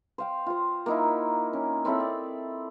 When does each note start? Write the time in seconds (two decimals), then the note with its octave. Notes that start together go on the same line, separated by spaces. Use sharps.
0.18 C5 F5 G5
0.46 F4 C5
0.86 A#3 D#4 E4
1.53 C#4
1.85 C4 C#4 E4 A4
2.00 D5